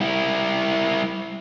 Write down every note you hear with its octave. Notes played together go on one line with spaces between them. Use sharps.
G3 E4